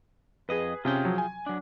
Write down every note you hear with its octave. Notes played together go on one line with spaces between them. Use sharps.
F2 G#4 B4 D#5
C3 C#4 F4 G#4 G5
F3 F#3
G#5
F#3 D4